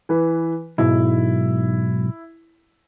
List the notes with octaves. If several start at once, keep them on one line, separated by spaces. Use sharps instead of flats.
E3 B4
B1 G#2 E4